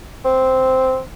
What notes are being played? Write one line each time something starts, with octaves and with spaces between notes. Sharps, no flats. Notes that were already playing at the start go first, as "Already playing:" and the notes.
C4